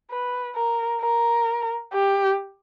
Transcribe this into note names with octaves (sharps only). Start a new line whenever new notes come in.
B4
A#4
A#4
G4